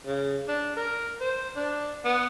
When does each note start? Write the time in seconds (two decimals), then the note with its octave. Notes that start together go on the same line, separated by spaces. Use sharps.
0.06 C#3
0.48 D4
0.76 A#4
1.20 C5
1.56 D4
2.05 B3